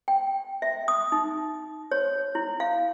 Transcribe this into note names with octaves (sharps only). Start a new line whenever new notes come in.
G5
E5
D#6
D#4
C#5
E4
F5